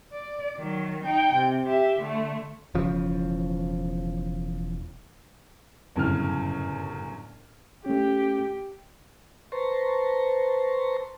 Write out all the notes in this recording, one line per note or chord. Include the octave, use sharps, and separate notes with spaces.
D5
D#3 F#3
D#4 G5
C3
G4 E5
D3 A3
E1 C#3 F3
G1 F#2 A2 C#3 F6
A3 C#4 G4
B4 C5 A5 A#5 C6 C#6